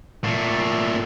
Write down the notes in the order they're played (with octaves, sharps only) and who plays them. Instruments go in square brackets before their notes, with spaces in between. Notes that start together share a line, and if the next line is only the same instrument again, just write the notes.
[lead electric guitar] A#2 A3